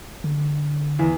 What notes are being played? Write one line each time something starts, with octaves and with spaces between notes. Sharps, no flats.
D3
E2